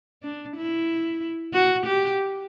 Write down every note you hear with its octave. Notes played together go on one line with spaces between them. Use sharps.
D4
E4
F#4
G4